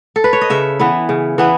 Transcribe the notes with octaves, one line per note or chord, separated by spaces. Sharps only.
A4
B4
C#5
D#5
C#3 E5
E3 B3 E4
C#3
E3 B3 E4